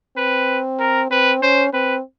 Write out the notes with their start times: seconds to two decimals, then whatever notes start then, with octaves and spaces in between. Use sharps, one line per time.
0.17 C4 B4
0.79 A#4
1.11 C4 B4
1.42 C#4 C5
1.73 C4 B4